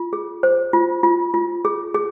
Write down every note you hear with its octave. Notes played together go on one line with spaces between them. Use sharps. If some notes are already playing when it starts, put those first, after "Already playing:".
Already playing: F4
G#4
C5
F4
F4
F4
G#4
G#4